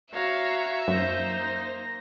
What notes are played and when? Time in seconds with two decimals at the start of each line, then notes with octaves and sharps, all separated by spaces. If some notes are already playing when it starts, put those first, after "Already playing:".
0.12 F#4 C#5 E5 F5 A#5
0.88 F#2 A#3 D#4 C5 A#6